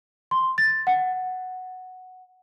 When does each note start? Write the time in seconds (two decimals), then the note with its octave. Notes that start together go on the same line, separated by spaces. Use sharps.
0.31 C6
0.58 A6
0.87 F#5